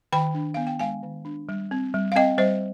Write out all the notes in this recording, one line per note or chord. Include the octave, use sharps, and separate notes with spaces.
D#3 G5 B5
D4
B3 F5
G5
G#3 F5 G#5
D#3
D4
G3
C4
G3
F5
C4 D#5 G5
G3 C5 D#5